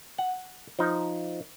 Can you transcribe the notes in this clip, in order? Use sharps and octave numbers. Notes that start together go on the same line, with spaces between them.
F#5
F3 D#4